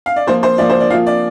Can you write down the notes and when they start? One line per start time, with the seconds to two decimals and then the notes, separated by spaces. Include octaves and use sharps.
0.06 F5
0.16 D5
0.27 F3 A#3 F4 C5
0.43 C5
0.58 F3 A#3 F4 D5
0.70 C5
0.80 D5
0.90 F3 A#3 F4 F5
1.07 D5